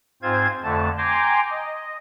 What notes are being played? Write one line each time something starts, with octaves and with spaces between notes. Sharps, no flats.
G#2 C4 F4 C5 G#6
F2 D3 A3 A5
G5 G#5 A#5 C6 D6
D#5